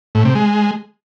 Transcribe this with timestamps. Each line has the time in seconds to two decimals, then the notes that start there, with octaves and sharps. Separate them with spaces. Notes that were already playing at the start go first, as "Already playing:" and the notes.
0.15 A2
0.25 C3
0.35 G#3